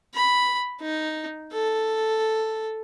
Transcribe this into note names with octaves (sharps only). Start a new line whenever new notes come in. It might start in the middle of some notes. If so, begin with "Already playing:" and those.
B5
D#4
A4